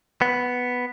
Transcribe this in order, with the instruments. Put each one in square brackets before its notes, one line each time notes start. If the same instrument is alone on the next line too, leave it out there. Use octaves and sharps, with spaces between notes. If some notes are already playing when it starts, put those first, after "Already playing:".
[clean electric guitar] B3